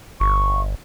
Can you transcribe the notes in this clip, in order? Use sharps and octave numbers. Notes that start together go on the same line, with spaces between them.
G1 C#6